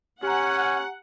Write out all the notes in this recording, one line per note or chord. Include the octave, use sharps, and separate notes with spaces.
C#4 G4 F#5 G#5 A#5